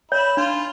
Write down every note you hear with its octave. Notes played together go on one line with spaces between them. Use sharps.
E4 C#5
D4 F4